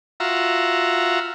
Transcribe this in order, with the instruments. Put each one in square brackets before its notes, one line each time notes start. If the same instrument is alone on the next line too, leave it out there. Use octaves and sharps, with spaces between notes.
[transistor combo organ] F4 F#4 E5 A#5